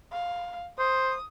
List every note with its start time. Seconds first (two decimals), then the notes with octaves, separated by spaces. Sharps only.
0.12 F5
0.79 C5 D#6